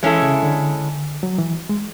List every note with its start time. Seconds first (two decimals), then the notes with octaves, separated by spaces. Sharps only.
0.03 E3 G#3 C#4 E4 A4
0.22 C#3
0.43 D3
1.23 F#3
1.38 E3
1.69 G#3